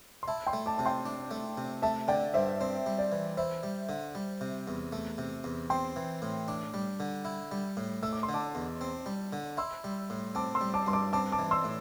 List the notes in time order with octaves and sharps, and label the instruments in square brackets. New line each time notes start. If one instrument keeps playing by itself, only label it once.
[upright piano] C6
[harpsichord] E4 [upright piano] E5 A5
[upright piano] G5 C6
[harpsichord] A3
[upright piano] A5 D6
[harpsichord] C3 [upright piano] A5
[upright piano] G5 C6
[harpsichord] D4
A3
C3
[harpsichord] A3 [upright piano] E5 A5
[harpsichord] D3 [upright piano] D5 G5
[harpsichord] G2 [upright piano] C5 E5
[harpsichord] C4 [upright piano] C5
[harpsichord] G3
[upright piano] D5
[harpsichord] E3
[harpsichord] E4 [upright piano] C5 E5
[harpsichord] G3
D3
G3
C3
E2
A3
C3
E2
[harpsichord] C4 [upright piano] G5 C6
[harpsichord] E3
A2
D4
G3
D3
E4
G3
A2
[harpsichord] A3 [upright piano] E6
[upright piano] D6
C6
[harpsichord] D3
[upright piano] A5 D6
[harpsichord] E2
C4
G3
D3
[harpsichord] E4 [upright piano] C6 E6
[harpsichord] G3
A2
[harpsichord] C4 [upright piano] A5 D6
[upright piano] C6 E6
[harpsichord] G3
[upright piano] A5 D6
[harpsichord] G2 [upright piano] C6
[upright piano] A5 D6
[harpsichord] C4 [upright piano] A5 D6
[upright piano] A5 D6
[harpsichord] E3
[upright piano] C6 E6
[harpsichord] A2